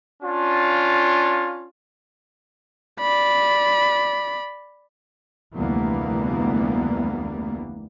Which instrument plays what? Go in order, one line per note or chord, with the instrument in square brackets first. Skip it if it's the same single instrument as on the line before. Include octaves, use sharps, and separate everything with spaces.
[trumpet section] C#4 D4 F4
[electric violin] D5 B5
[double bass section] F1 D2 E3 G3 A#3 B3